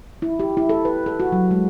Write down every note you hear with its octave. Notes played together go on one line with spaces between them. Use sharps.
E4
G4
E4
A4
B4
A4
F#4
F#3
G#3